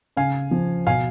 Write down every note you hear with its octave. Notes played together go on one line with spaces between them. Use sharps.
C#3 F5 G#5
F3
B2 F5 G#5